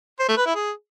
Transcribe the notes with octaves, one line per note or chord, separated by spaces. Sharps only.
C5
A3
B4
E4
G#4